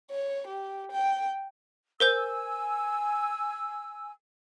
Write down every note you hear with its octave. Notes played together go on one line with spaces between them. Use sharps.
C#5
G4
G5
A#4 C5 G#5 E6 G6